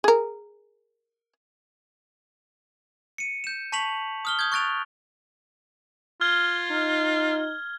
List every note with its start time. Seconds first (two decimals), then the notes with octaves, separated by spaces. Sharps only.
0.04 G#4 A#4
3.18 C#7 D#7
3.44 G6 E7
3.72 A5 C#6 B6 F7 F#7
4.25 D#6 F6 G7
4.39 D#6 G6 G#6
4.52 C#6 F#6 A6 D7 F7
6.21 F4 F6 G#6 G7
6.71 D#4